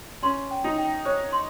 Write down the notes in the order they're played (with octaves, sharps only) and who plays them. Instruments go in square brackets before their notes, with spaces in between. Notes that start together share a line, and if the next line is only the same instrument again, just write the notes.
[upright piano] C#4 [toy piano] C6
[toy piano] G5
[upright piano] D#4
[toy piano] G5
[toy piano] C5 [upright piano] C#5
[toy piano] C6